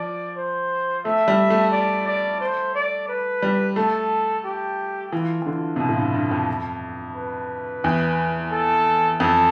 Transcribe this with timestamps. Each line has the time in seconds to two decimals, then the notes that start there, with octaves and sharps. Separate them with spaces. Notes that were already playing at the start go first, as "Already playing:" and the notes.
Already playing: F3 D5
0.37 C5
1.05 A3 E5
1.28 G3
1.50 A3
1.72 D5
2.07 D5
2.40 C5
2.75 D5
3.09 B4
3.42 G3
3.76 A3 A4
4.45 G4
5.12 E3 F4
5.42 E3
5.46 D3
5.76 C3
5.80 B2 F4
5.89 A2
5.97 G2
6.14 G2
6.31 F2
7.16 B4
7.84 E2
8.52 A4
9.20 F2 A4